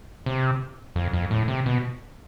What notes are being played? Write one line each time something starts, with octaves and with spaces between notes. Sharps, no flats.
C3
F2
F2
A2
C3
B2